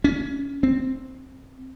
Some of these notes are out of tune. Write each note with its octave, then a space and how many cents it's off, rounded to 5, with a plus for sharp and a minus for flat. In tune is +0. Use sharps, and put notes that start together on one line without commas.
C#4 +15
C4 +0